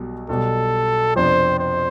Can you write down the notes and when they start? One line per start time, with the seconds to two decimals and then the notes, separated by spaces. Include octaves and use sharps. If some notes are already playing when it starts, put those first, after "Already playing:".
Already playing: B1 B2 G3
0.29 B1 B2 G3 B3 A4
1.15 F2 C3 F3 B3 D4 C5
1.59 C5